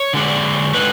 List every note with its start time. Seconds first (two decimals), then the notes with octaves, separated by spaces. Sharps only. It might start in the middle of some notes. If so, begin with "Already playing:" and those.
Already playing: C#5
0.13 D3 G#3 D4
0.74 D3 G#3 D4 B4